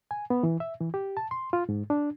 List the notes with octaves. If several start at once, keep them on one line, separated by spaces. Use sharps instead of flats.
G#5
B3
E3
E5
E3
G4
A5
C6
F4
G#2
D4